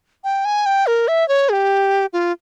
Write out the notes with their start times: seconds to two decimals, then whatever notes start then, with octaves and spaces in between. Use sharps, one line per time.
0.24 G5
0.45 G#5
0.66 G5
0.87 A#4
1.08 E5
1.29 C#5
1.49 G#4
1.53 G4
2.13 F4